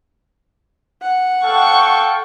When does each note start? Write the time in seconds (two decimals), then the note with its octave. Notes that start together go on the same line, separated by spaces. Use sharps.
1.02 F#5
1.44 A4 F5 G5 C#6